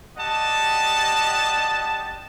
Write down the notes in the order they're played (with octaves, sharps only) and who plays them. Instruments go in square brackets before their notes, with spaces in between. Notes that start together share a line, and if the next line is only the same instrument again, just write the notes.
[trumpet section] G4 D5 D#5 F#5 A5